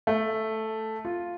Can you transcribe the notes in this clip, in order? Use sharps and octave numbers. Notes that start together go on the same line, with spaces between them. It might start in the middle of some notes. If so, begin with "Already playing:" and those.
A3
F4